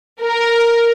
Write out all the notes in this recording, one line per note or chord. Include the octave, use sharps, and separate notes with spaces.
A#4